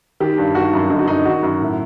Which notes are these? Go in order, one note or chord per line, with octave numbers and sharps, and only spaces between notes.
D#3 G4
G2
D#3 F#4
F#2
D3 D#4
F#4
F#2 D#4
D#3 F#4
F#2
A2